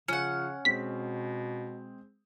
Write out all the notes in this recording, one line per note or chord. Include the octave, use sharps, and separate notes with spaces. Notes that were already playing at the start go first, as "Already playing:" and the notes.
C#3 F3 C#4 F#5
B2 G#3 C4 G#4 B6